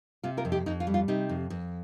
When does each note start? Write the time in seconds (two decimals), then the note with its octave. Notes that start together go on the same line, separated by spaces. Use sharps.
0.23 C3 F4
0.37 F4 A#4
0.45 F2
0.52 D#4 G4
0.66 F2 D#4
0.80 F4
0.87 G3
0.94 F4
1.08 C3 D#4 G4
1.29 F2
1.50 F2